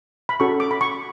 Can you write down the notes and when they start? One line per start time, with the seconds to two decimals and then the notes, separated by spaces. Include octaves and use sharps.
0.29 B5
0.40 C#4 F#4 A4 C#6
0.60 D6
0.71 B5
0.81 C#6